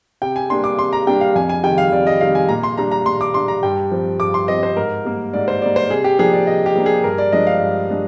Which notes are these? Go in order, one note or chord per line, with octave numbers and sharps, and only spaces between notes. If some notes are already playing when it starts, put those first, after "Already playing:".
C3 G5
G#5
G3 A#3 D4 C6
D6
C3 C6
A#5
G3 A#3 D4 G5
F5
F2 G#5
G#5
C3 D#3 G3 G5
F5
F2 D5
D#5
C3 D#3 G3 F5
G#5
A#2 A#5
C6
G3 D4 A#5
A#5
A#2 C6
D6
G3 D4 C6
A#5
G2 G5
F3 C4
G2 D6
C6
F3 C4 D#5
C5
G#2 A#4
G3 A#3
G#2 D5
C5
G3 A#3 D5
C5
C3 G#4
G4
F3 A#3 D4 G#4
D5
C3 D#5
G4
F3 A#3 D4
G#4
G2 A#4
D5
F3 G#3 D4 D#5
F5
G2
G#3 D4